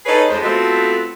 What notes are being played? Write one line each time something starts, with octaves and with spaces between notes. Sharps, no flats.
D#4 G#4 A4 B4 C#5
F2 G#3 C5
A3 B3 C4 F4 F#4 A4